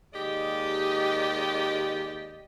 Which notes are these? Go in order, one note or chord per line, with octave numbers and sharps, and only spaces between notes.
D#2 G#3 G4 D5 D#5